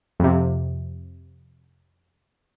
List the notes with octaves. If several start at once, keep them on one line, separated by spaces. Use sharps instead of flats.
F2 C3